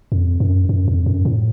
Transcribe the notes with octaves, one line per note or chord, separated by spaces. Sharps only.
F2
F#2
F#2
F2
F#2
A2